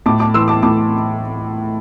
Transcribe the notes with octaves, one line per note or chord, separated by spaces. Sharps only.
A2 A5 D6
A5 D6
E3 C6 E6
A5 D6
A2 A5 D6